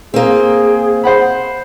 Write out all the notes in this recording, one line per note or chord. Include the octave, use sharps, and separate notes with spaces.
A#3 C4 G#4
C5 F#5 B5